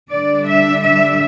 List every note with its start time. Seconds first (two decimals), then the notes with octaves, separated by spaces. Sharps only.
0.10 D3 G3 D4 D5
0.48 E5
0.83 E5